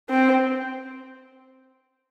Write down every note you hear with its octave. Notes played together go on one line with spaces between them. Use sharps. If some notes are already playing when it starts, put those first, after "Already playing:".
C4